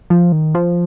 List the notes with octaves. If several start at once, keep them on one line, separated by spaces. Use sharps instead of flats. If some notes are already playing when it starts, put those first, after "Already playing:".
F3
D#3
F3